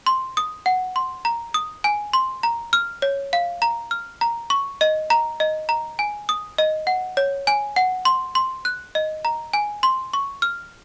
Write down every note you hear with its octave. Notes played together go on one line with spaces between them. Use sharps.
C6
D#6
F#5
C6
A#5
D#6
G#5
C6
A#5
F6
C#5
F5
A#5
F6
A#5
C#6
D#5
A#5
D#5
A#5
G#5
D#6
D#5
F#5
C#5
G#5
F#5
C6
C6
F#6
D#5
A#5
G#5
C6
C#6
F6